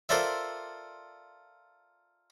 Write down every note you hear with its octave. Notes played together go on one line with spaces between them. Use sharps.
F4 A4 A#4 C5 D5 E5